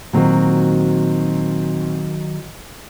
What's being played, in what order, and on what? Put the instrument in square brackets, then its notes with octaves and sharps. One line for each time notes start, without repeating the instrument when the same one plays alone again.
[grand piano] A#2 C4 F#4 [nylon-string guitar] D#3 F#3